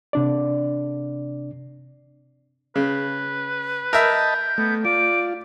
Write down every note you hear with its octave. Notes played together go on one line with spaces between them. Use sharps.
C3 D4 D5
C#3 B4
A#4 D#5 E5 A5 B5 G6
A3 B3
F4 D5 D7